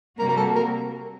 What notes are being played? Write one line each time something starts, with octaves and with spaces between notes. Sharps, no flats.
C3 G3 A#3 F#4 A#4
A#4
A4
A#4